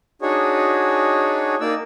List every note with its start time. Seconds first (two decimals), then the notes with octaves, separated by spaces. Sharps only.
0.22 D4 D#4 F#4 G#4 C#5
1.61 A#3 D#4 D5 E6